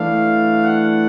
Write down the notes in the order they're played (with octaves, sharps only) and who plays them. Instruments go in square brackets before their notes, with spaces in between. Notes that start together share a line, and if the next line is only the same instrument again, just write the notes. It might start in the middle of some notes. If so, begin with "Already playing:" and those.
Already playing: [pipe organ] E3 A3 D4 F5
F#5